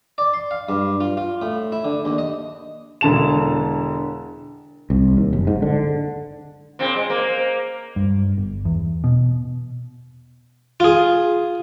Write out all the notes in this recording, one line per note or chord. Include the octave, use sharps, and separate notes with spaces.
D5
C6
F5
G2
F4
F4
A2
E4
D3
D#2
D#5
E1 D3 A5 E7
C2
D#2
F#1
G#2
D3
A#2 C#3 C4
G#3
A#3 C5
G2
G1
E2
B2
F4 G#4